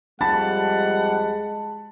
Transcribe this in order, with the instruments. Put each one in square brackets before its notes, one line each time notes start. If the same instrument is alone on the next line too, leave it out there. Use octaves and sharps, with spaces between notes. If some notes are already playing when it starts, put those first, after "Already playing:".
[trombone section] F2 G3 [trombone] G#3 [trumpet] F#5 [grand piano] A5 B5 A6